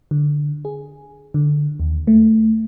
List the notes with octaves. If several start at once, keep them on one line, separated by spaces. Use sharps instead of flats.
D3
G#4
D3
D#2
A3